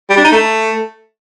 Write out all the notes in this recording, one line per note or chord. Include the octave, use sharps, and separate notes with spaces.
G3
D4
D#4
A3